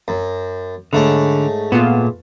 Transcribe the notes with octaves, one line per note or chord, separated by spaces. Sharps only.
F#2
G#2 D3 A3 C#4
A#2 B3 F4